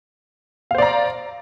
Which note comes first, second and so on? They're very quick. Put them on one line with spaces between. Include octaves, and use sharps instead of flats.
F5 C5 D5 A#5